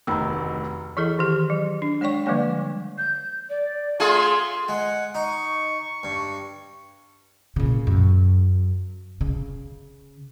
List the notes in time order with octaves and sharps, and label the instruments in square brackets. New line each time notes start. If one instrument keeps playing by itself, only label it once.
[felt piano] F1 D2 D#3 [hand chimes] A#5 B5 E6
[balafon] E3 E4 G#4 A4 D#5
D#3 G4
F#3
D4
G#3 C#5 D5 G5 C#6
D3 F3 G3 G#3 A#3 C#5
[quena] G6
D5
[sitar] A3 F4 G#4 [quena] C6
[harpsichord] G#3 [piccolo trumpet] F#5
[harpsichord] D#4 [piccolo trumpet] C#6
[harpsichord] G2
[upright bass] A#2 C#3
F#2
C#3